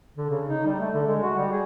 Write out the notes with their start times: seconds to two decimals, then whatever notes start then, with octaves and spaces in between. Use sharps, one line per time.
0.17 D3
0.30 C#3
0.46 D#4
0.65 G3
0.80 A3
0.93 D3
1.06 G#3
1.22 F#4
1.37 G3
1.52 G#4